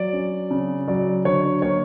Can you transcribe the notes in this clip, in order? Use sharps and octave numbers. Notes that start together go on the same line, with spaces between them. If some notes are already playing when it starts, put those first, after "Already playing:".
Already playing: F#3 D5
C#4
C#3
F#3 D5
D3 C#5
A#3 C#5